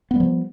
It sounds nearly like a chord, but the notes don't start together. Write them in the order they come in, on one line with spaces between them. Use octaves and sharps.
B3 G3 F3